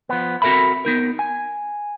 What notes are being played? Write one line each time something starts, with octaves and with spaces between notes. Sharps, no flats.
F3 B3
C4 F#4 A4 A#4 E5 B5
B3 D#4 A#4
G#5